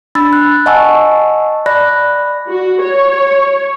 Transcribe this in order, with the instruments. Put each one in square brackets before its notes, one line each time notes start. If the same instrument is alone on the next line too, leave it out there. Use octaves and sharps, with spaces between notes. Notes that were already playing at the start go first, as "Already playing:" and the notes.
[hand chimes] D4 B5 E6 A6
F#6
D#5 F#5 G#5 A5 C#6 E6
D5 B5 F#6 A#6
[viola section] F#4
C#5